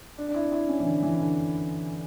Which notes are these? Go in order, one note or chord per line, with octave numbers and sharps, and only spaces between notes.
D4
D4
E4
E4
C#4
E3
D3
E3
D3